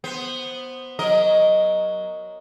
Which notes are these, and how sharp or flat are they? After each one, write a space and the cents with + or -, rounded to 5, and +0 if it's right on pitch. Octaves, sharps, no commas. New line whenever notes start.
B3 +0 C5 +0
F#3 +0 A#4 +0 D#5 +0